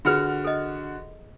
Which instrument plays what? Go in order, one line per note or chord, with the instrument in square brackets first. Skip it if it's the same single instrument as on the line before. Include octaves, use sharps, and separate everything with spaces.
[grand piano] D3 F#4 F6 [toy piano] F4 G#4 B4
[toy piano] A4 D#5